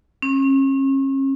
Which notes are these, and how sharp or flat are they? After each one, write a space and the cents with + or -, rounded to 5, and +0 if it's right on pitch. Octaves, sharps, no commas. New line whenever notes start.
C#4 -40